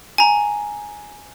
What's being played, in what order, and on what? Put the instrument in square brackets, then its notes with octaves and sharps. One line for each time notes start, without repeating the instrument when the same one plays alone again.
[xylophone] G#5 A#5